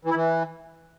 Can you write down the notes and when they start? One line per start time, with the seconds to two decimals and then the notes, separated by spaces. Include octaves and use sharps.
0.05 E3
0.10 E4
0.16 E3